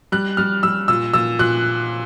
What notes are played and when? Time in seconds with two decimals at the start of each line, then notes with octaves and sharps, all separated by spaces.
0.12 G3 F#6
0.37 G3 F6
0.63 G3 E6
0.88 A#2 E6
1.14 A#2 E6
1.39 A#2 F#6